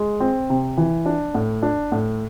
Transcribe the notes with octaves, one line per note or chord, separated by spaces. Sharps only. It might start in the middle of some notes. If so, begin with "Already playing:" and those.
Already playing: G#3
C4
C3
E3
D4
A2
D4
A2